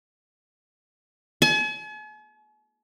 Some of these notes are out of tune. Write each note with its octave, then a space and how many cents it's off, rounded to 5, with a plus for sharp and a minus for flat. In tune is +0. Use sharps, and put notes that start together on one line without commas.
G#5 +45